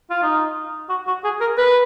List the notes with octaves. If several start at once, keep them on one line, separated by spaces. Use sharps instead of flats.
F4
D#4
F#4
F#4
G#4
A#4
B4